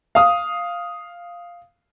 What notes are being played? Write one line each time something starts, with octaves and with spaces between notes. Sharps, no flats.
F5 D#6